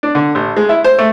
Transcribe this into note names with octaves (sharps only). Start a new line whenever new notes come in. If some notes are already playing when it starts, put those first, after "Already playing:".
D4
D3
A1
G#3
E4
C5
A3